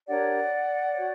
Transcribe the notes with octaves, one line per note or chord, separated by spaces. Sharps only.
D4 G4 A#4 C#5 D5 F#5
F#4 C#5